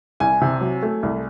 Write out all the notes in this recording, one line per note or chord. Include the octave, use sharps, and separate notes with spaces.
C2 G#5
C3
F#3
A3
C2